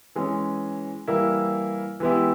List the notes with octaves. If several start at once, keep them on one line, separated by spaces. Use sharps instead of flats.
E3 G#3 C#4
E3 G3 A#3 E4 A#4
E3 G#3 B3 E4 G4